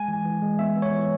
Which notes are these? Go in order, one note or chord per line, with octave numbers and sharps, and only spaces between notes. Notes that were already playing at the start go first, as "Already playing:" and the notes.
Already playing: G#3 G#5
E3
E3
G#3
B3 E5
B3
C#5
E3